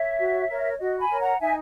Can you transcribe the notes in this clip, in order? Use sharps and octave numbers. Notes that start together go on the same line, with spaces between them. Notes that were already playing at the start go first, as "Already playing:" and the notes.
Already playing: C#5 E5
F#4
A#4 C#5
F#4 D#5
G#5 B5
A#4 C#5
F#5 A#5
D#4 E5 G#5